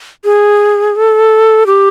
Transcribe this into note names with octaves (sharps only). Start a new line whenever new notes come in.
G#4
A4
G4